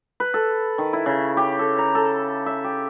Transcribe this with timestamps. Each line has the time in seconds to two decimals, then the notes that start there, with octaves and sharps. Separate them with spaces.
0.20 B4
0.34 A4
0.78 D#3
0.93 E4
1.06 C#3
1.37 G4
1.59 A4
1.78 A#5
1.95 A4
2.46 E5
2.64 G4